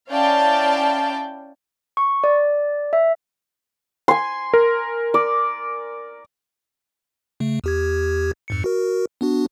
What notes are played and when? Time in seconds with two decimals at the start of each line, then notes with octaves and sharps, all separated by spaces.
0.10 C#4 E4 D5 F5 G5 A5
1.97 C#6
2.24 D5
2.93 E5
4.08 G#5 C6
4.54 A#4
5.14 D5
7.40 C#3 A3
7.64 E2 G4 G#6
8.48 F2 G#2 C#7
8.64 F#4 A#4
9.21 B3 D4 F#4